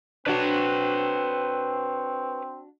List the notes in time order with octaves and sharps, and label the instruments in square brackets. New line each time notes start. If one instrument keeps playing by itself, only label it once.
[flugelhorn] C4 [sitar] D4 F#4 [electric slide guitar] B4 C#5